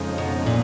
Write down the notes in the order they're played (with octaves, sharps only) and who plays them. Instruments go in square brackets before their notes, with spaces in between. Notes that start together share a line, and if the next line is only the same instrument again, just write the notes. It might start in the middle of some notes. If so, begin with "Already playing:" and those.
Already playing: [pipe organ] F2 C#3 F3 G#3 D#4
[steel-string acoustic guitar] B2
A#2